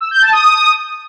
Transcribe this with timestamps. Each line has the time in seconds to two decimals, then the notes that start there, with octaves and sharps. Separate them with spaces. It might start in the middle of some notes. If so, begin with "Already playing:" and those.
0.01 E6
0.11 G6
0.22 A5
0.32 D#6